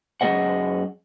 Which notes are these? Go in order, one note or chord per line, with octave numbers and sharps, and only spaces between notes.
F#2 A3 G#4 D#5 F#5